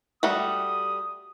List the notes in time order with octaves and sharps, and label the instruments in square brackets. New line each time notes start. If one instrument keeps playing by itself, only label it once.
[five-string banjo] G3 A3 F#4 [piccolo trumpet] D#6